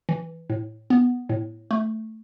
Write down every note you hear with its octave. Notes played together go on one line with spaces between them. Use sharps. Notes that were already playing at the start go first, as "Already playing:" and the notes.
E3
A2
B3
A2
A3